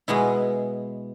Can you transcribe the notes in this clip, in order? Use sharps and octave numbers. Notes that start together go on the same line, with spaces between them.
B2 G#3 B3 E4